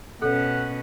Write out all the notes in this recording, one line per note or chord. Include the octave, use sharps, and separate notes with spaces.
B2 C#4 A4 C#5 F#5